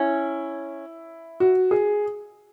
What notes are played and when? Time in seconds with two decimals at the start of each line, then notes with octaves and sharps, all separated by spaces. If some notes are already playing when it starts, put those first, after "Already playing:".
Already playing: C#4 E4
1.40 F#4
1.71 G#4